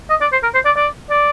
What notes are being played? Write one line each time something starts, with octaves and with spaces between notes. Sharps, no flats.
D#5
D5
C5
A#4
C5
D5
D5
D5